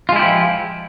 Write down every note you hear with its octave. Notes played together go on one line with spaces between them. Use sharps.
F3 G#3 E4 F4 G4